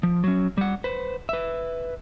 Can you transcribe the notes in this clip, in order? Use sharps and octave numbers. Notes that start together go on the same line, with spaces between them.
F3
F#3 C#4
G3 F#5
B4 C5
B4 E5